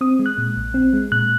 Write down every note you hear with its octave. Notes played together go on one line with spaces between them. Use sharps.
C4 D#6
G#3
F#6
A#2
A#1
C4
G#3
A#2 F#6